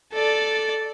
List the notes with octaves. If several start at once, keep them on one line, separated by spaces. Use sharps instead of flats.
A4 D5